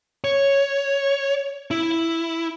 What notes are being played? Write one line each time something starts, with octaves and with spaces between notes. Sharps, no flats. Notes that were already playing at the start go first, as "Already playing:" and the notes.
C#5
E4